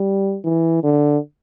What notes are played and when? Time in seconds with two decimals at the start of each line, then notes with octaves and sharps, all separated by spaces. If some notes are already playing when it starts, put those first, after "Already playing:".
Already playing: G3
0.45 E3
0.83 D3